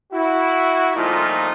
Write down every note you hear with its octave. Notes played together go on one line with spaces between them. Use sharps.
E4 F#4
C2 A#2 F3 A3 D#4 F4